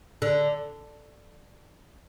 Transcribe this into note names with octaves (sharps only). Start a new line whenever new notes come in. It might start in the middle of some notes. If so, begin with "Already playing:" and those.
D3